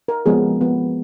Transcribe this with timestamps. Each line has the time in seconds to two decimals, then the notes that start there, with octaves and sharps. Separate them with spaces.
0.08 A#4
0.26 F3 G#3 B3 G#4
0.61 F3 B3